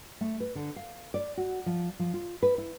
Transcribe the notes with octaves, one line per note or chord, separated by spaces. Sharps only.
A3
B4
D3
F5
D5
F#4
F3
F3
F4
B4
E4